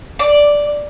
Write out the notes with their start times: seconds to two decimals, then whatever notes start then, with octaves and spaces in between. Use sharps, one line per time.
0.19 D5